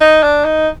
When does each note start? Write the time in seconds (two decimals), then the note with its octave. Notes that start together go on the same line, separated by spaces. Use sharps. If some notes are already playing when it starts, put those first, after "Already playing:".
0.01 D#4
0.23 D4
0.45 D#4